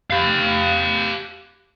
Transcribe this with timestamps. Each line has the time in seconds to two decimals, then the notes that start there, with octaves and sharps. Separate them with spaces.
0.10 G4 F5